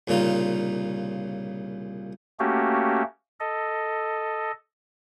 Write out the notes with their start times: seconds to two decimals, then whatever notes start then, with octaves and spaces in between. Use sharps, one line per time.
0.08 C2 A#2 C#3 D#4 F4
2.39 A3 A#3 C#4 F#4 G4
3.40 A4 D#5